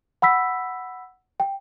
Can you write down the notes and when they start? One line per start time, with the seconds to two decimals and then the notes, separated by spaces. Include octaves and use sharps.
0.22 F#5 B5 E6 B6
1.40 G5